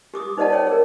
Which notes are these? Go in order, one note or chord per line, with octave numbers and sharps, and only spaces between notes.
G4 D6 D#6
D#4 C5 D5 D#5 F#5 A5
C#5 G5
G#4 A#4